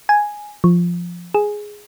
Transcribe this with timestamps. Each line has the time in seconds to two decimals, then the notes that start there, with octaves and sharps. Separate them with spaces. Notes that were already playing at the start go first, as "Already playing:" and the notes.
0.09 G#5
0.64 F3
1.34 G#4